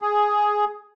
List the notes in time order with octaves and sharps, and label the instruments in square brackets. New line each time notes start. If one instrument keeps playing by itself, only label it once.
[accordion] G#4